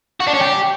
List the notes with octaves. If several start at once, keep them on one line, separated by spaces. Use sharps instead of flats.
F#4
D4
C#4
G4